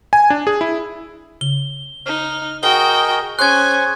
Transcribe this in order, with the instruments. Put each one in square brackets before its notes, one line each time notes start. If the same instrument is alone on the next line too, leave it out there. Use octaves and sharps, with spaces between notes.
[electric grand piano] G#5
D4
G#4
E4
[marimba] C#3 [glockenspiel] G7
[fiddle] D#4 [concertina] F6
[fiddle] F#4 G5 [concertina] G#4 A#4 D#5 [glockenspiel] G7
[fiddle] C#4 G#5 [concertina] G#4 C5 C#6 [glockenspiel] F#6 G#6